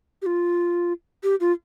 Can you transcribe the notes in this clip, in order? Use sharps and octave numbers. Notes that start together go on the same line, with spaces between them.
G4
F4
G4
F4